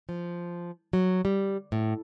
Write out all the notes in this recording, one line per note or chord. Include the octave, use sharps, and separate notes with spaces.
F3
F#3
G3
A2